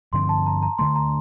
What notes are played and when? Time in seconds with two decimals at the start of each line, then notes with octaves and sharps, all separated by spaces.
0.13 G2 D3 F3 C4 C6
0.29 A5
0.46 A#5
0.63 A#5
0.78 D2 D3 A3 C6
0.96 A#5